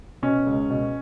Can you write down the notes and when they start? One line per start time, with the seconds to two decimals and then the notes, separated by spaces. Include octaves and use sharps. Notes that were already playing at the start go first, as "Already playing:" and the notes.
0.22 B2 C#4
0.47 C#2
0.70 B2